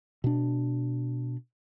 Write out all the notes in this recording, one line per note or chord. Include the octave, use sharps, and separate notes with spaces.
B2 D4